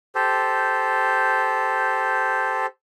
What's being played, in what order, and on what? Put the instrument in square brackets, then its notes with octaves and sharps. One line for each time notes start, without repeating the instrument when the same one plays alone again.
[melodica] G4 A4 C5